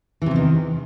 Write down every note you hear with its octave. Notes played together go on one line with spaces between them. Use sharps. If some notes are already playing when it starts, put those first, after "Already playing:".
E2 C3 D#3 E3